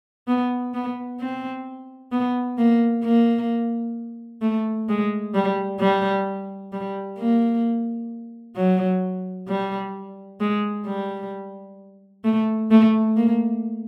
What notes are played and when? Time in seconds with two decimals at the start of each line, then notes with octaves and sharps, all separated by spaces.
0.28 B3
0.74 B3
1.20 C4
2.12 B3
2.58 A#3
3.04 A#3
4.42 A3
4.89 G#3
5.35 G3
5.80 G3
6.72 G3
7.19 A#3
8.56 F#3
9.48 G3
10.40 G#3
10.86 G3
12.24 A3
12.71 A3
13.17 A#3